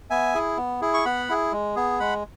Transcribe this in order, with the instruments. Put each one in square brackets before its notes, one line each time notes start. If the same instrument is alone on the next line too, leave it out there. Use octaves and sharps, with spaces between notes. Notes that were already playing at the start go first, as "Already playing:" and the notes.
[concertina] B3 E5 G#5
E4 G#4
B3
E4 G#4
C#6
B3 F#5 B5
E4 G#4
G#3
B3 G#4
G#3 F#5 B5